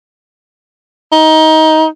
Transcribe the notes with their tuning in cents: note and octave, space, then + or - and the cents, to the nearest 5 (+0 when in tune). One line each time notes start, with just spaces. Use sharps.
D#4 +20